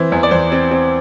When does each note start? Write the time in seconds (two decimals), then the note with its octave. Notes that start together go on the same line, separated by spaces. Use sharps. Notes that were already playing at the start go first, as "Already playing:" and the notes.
Already playing: E3 C4 C5
0.12 E2
0.23 D5
0.31 E2 C5
0.52 C4
0.71 C4